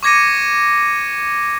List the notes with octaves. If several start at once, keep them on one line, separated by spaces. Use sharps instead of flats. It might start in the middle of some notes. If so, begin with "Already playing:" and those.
C#6 D6 G#6 A#6 C#7 D#7